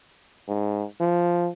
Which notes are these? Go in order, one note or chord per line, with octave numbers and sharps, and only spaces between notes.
G#2
F3